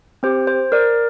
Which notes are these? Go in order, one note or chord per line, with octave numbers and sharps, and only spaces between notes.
C4 G4 C5
C5
A#4 D5